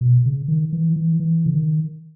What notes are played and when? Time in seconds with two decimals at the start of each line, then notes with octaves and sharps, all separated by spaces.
0.01 B2
0.26 C#3
0.48 D#3
0.73 E3
0.96 E3
1.20 E3
1.46 C#3
1.55 D#3